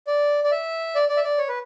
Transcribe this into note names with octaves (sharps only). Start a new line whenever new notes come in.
D5
D5
E5
D5
D5
E5
D5
C#5
B4